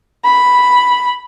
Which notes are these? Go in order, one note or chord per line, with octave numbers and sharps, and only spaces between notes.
B5